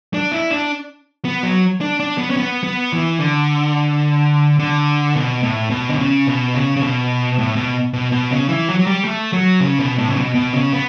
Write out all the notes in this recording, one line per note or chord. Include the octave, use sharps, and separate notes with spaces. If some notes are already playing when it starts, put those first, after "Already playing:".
D4
E4
D4
B3
F#3
D4
D4
B3
C#4
B3
B3
E3
D3
D3
B2
A2
B2
D3
C#3
B2
C#3
C#3
B2
A2
B2
B2
B2
C#3
E3
F#3
F#3
G3
A3
F#3
C#3
B2
A2
C#3
B2
B2
C#3
B3